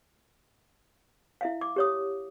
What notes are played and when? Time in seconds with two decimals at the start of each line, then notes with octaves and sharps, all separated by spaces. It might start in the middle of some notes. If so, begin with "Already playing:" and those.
1.41 E4 E5 F5
1.61 D6
1.76 G4 C#5 D#6